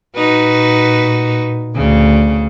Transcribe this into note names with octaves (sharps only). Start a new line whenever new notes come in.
A#2 D#4 F#4 B4
D2 C#3